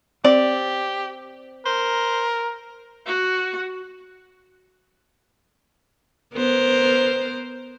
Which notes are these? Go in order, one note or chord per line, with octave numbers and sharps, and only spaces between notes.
C4 G4 D5
A#4 C5
F#4
B3 A#4 C5